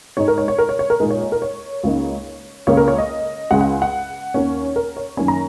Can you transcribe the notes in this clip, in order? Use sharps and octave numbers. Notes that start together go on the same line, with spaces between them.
G#2 G#3 D#4 C#5
A#4
C#5
C#5
A#4
C#5
C#5
A#4
A#2 G#3 D#4 A#4
C#5
C#5
A#4
C#5
C#2 C#3 A#3 D#4
C#2 C#3 A#3 C#4 C#5
A#4
C#5
D#5
C#2 C#3 G#3 F#5
F#5
F#5
D#2 D#3 A#3 C#4 C#5
A#4
C#5
F#2 D#3 A#3 C#4 G#5
A#5